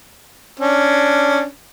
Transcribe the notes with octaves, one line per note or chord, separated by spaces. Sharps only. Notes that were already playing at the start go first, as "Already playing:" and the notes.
C#4 D4